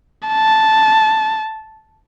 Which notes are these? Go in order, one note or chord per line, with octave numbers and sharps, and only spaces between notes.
A5